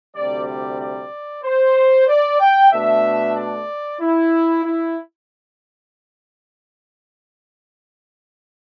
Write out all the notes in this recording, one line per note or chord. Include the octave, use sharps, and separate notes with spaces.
D2 C3 G3 D5
D5
D5
C5
D5
G5
B2 A3 D4 E5
D5
E4
E4